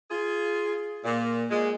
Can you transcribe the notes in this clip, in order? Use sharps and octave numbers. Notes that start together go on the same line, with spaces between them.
F4 G#4
A#2
A#2 G#3